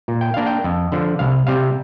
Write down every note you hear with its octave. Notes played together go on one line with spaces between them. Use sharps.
A#2
G5
A#3 D4 F5
G5
F2
D3 F3
C2 F5
C3 G3 F5